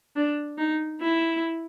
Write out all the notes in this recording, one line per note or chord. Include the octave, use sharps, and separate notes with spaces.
D4
D#4
E4